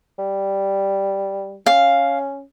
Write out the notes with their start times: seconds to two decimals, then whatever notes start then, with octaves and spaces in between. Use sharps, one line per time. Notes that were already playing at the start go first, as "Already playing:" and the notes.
0.19 G3
1.66 C#4 F5